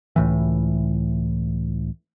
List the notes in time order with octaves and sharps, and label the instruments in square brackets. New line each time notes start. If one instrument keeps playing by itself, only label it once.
[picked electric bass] C#2 A2 E3